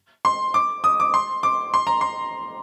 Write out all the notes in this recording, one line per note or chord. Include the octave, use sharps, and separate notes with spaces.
C6
D6
D#6
D6
C6
D6
C6
A#5
C6